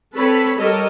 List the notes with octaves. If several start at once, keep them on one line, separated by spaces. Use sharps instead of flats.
C4 A4 B4 C#5 B5
G3 A4 A#4 C#5 D#5